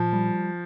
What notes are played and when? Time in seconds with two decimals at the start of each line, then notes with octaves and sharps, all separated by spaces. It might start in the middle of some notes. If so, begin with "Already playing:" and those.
Already playing: A#2 F3
0.13 G3